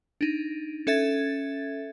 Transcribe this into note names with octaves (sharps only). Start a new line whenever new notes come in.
D4 D#4
C#4 A4 E5 G#6 A6